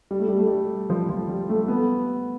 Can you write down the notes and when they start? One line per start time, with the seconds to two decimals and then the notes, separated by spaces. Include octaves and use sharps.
0.11 G3
0.20 A3
0.28 G3
0.38 A3
0.47 G3
0.90 F3
1.09 F3
1.29 G3
1.49 A3
1.68 B3